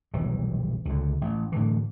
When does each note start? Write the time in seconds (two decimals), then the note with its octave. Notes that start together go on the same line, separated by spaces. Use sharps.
0.14 D#1 B1 E3 F#3
0.85 C#2 D3
1.21 A1
1.52 A2 D3 E3